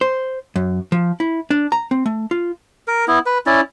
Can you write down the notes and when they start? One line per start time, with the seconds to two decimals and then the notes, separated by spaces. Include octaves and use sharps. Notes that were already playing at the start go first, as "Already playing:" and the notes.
0.01 C5
0.56 F#2
0.92 F3
1.20 E4
1.50 D4
1.72 A#5
1.91 C4
2.06 A3
2.31 F4
2.88 A#4
3.08 B3 E4
3.26 B4
3.46 C#4 E4 D5